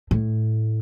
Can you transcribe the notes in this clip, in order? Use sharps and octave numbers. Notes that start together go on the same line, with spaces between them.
A2